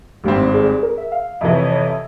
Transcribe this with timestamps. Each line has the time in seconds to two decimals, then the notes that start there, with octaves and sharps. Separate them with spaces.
0.24 G#1 G2 G3 C4 G4
0.54 G#4
0.68 G#4
0.83 A#4
0.98 E5
1.12 F5
1.41 F2 C3 E3 E5
1.52 C#5
1.71 C#5
1.86 E5